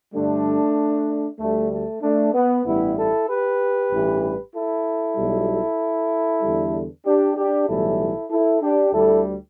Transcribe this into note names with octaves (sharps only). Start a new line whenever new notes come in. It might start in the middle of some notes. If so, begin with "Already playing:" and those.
G2 D3 G3 A3 D4
D2 D3 G3 A3
A3
A3 D4
B3
A1 G2 G3 B3 E4
E4 A4
G4 B4
A1 G2 E3 G3
E4 A4
B1 B2 G3
E2 D3 G3
D4 G4
D4 G4
B1 A2 E3 G3 E4 A4
E4 A4
D4 G4
D2 D3 G3 E4 A4